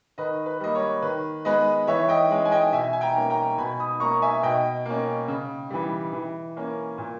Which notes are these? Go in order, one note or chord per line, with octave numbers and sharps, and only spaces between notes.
D#3 B4 D#5
B4
G3 A#3 D#5
C#5
D#3 B4
G#3 B3 B4 D#5
E3 C#5 E5
D#5 G5
G#3 C#4
G#5
D#5 G5
B2 E5 G#5
G#5
G5 A#5
A#3 C#4
G5 A#5
B2 G#5 B5
B5 D#6
A#3 C#4 A#5 C#6
E5 G#5
B2 D#5 G5
A#3 C#4
C#3
E3 G3
E3
A#3 C#4
A#2